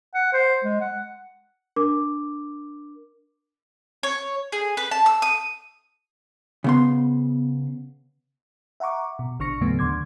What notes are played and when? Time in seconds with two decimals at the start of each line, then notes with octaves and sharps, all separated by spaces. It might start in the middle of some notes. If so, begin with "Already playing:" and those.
0.15 F#5
0.33 C5
0.64 G#3
0.81 F#5
1.76 D4 A#4 D6
4.03 C#5
4.52 G#4
4.77 B4
4.91 A5
5.06 E6
5.22 D#6
6.64 C#3 B3 C6
8.80 E5 F#5 A#5 C#6 D6
9.19 B2
9.39 A1 D3 D4 C#6 A#6 C#7
9.61 D#2 A2 C#3 F#3 A3 B3
9.79 D#2 D3 C6 D6 G#6